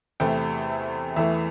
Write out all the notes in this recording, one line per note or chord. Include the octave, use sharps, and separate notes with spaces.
E2 C3 A3 G5
E2 E3 A3 E5